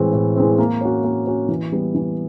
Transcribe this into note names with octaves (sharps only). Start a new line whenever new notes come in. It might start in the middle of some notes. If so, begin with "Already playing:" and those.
Already playing: A2 E3 G#3 C4
A2
E3 G#3 C4
A#3
C#4 F#4
A#3
C#4 F#4
E3
G3 B3
E3